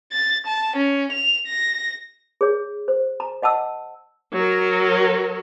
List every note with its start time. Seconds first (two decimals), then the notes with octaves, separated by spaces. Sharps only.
0.13 A6
0.46 A5
0.76 C#4
1.12 F7
1.48 A#6
2.41 G#4 C#5
2.88 C5
3.20 A#5
3.42 D#5 F#5 A5 E6
4.33 F#3 A#4